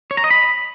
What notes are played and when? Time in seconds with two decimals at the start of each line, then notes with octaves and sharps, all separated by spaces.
0.11 C#5
0.17 A#5
0.24 D#5
0.30 B5